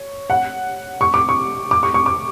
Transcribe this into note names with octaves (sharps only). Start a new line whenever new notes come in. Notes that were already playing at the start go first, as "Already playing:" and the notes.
Already playing: C#5
F#5
C#6
D6
C#6
D6
C#6
C#6
D6